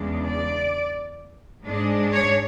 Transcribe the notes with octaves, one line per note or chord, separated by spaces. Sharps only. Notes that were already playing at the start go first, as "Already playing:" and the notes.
Already playing: E2 C#3 G#3 D4
D5
G#2 G#3 D4
C#5